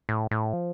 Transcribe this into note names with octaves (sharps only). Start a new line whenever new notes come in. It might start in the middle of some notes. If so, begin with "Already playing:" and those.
A2
A2
F3